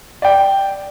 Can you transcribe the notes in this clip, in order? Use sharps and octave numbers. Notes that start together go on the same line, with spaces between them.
D5 G5